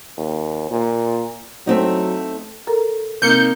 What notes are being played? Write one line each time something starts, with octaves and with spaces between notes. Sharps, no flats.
D#2
A#2
F#3 A3 C4 D#4
A4 A#4 A#5
C3 A#3 C4 D#4 G6 C#7